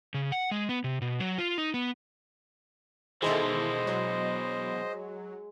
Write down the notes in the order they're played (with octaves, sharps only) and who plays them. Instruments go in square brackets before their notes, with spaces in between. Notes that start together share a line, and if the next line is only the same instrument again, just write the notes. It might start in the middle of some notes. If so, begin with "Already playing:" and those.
[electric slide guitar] C#3
F#5
G#3
B3
C3
B2
F#3
F4
D#4
B3
[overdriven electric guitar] B2 E3 [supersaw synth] D#3 E4 A4 [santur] G#3 [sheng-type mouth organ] C5 D#5
[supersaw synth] F#3